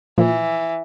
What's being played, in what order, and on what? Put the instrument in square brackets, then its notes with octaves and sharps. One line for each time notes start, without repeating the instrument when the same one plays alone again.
[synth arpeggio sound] A#2 F3 [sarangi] E3